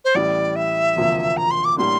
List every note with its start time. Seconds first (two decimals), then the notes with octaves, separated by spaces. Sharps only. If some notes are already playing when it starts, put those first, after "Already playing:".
0.04 C5
0.15 A1 A2 G3 D5
0.55 E5
0.96 E1 D2 C3 F3 A#3
1.37 A#5
1.50 C6
1.64 D6
1.77 A2 G3 A#3 D4 C6